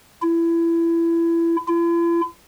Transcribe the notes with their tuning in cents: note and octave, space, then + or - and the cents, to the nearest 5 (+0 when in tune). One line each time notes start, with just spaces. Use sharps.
E4 +25
E4 +45